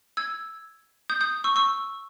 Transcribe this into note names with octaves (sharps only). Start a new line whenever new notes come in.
E6 G#6
D#6 G6
D#6 G6
C#6 E6
C#6 E6